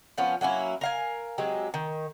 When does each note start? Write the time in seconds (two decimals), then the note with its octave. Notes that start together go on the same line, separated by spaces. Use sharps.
0.18 F3 B3 C#4 F4
0.41 F#3 A#3 C#4 E4
0.81 A#4 F5 G#5
1.38 F#3 G#3 C4 G4
1.74 D#3